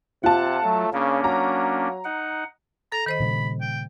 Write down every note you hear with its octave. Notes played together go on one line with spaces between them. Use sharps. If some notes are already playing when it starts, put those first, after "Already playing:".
C3 F4 F#5 A5
F#3 A3
C#3 A#3 C#4 D4
F#3 A#5
D#4 F#5
A4 A#5
D#3 C5 D#5 B5
A#2 C#3 G3
G5